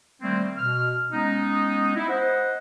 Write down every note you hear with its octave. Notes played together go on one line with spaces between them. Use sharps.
D#3 G3 A3 A#3 C4
B2 F6
G#3 B3 C#4 D#4
E4
C5 D#5 F#5